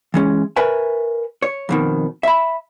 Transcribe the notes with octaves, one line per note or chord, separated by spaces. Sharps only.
E3 G#3 C#4
A#4 B4 C#5 E5 G#5
C#5
F2 B2 D#3
E5 B5